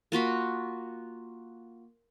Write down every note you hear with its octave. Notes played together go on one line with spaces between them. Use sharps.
A#3 F4 F#4 B5